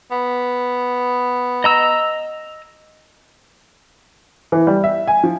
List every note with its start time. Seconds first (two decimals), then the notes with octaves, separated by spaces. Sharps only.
0.11 B3
1.64 D#5 A#5 E6
4.52 E3
4.67 G3
4.84 E5
5.08 G#5
5.23 F3